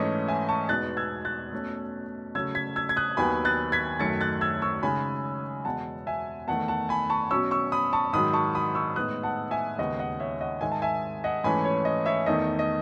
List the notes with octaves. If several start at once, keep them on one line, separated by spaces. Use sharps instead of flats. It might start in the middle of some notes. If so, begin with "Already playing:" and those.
Already playing: G#2 E3 A3 C#4 D#5
E5 G#5
A5 C#6
E2 B2 G#3 B3 D#4 F#6 A6
E6 G#6
F#6 A6
B2 A3 C#4
C#3 F#3 A3 C#4 E6 G#6
G#6 B6
E6 G#6
G#6
D#6 F#6
D#2 D#3 F#3 B3 G#5 B5
F#6 A6
G#6 B6
F#2 D#3 A3 A6 C#7
F#6 A6
E6 G#6
C#6 E6
C#3 G#3 D#4 G#5 B5
E2 B2 G#3 F#5 A5
E5 G#5
E2 D#3 A3 F#5 A5
F#5 A5
G#5 B5
A5 C#6
B2 F#3 C#4 C#6 E6
C#6 E6
B5 D#6
A5 C#6
G#2 D#3 F#3 B5 D#6
A5 C#6
B5 D#6
C#6 E6
A2 G#3 B3 D#4 D#6 F#6
F#5 A5
E5 G#5
D#2 C#3 G#3 B3 D#4 D#5 F#5
D#5 F#5
C#5 E5
D#5 F#5
G#2 D#3 G#3 E5 G#5
A5
E5 G#5
D#5 F#5
G#2 E3 A3 C#4 G#5 B5
C#5
D#5
C#5 E5
E2 D#3 A3 D#4 D#5
D#5